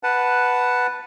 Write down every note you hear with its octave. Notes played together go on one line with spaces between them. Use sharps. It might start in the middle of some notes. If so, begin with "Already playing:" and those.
B4 F#5 A5